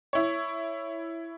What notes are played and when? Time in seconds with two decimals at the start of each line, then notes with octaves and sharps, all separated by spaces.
0.13 E4 C#5